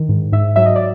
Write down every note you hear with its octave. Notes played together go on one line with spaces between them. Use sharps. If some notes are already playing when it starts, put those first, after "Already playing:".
Already playing: D#3
G#2
G#2 E5
F#3 E5
D#5
D5